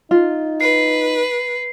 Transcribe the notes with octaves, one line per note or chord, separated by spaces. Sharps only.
D#4 F4
B4 C7